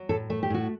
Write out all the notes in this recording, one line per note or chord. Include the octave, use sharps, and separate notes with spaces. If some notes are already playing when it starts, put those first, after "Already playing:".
Already playing: F#3
A2 A4
A3 A4
G4
A2 F#4